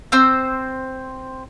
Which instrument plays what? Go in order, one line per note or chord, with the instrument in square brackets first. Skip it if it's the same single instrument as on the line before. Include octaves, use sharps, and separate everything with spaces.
[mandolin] C4 C5 E6